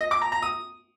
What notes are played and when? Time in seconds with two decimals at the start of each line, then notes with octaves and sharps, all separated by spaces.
0.01 D#5
0.11 D6
0.22 A#5
0.32 A#5
0.43 D#6